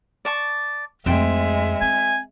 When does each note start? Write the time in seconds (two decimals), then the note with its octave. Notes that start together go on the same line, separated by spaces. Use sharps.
0.25 D5 A5 C#6
1.06 F2 G#3 A3 C5 E5 G5
1.81 C4 G#5